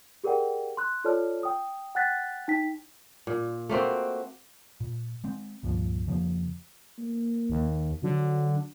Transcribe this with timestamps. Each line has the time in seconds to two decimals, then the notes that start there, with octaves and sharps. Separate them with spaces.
0.24 G4 G#4 A#4 D5 F#5 G5
0.77 C6 F#6
1.04 F4 A4 C#5 D5 A5 F6
1.43 G5 D#6
1.95 F#5 G5 F#6 A6 B6
2.48 D#4 G5 B6
3.27 A#2
3.69 A3 A#3 C4 F#4
4.80 A#2
5.24 G#3 C4
5.63 C#2 G2 A#2 F3
6.07 F2 C#3 F3 A#3
6.98 A#3
7.50 D#2
8.03 D3 F#3